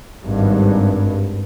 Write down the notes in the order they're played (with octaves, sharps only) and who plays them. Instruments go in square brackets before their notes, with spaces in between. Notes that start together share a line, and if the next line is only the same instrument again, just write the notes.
[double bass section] G#1 G2